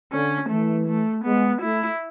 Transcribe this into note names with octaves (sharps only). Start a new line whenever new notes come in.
D3 C#4
E3 A3
A3
G#3 B3
A3 E4